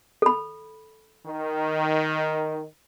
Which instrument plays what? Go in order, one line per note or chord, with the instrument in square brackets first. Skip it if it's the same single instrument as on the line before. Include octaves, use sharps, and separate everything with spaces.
[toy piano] A4 B5
[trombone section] D#3